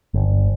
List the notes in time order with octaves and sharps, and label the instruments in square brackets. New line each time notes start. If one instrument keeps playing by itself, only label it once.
[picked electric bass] G1